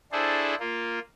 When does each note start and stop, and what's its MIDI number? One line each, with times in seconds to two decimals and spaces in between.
0.12 0.55 62
0.12 0.55 64
0.12 0.55 68
0.12 0.55 69
0.12 0.55 72
0.60 0.99 58
0.60 0.99 65